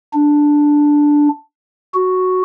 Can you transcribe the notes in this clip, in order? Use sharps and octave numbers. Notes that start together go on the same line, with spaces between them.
D4
F#4